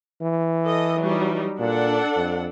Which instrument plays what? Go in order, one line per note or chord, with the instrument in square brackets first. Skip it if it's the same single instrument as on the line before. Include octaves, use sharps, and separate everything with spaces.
[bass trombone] E3
[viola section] A4 D#5
F#3 G3 D#4
[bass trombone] A#2 [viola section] D4 A4 F#5
[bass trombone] F2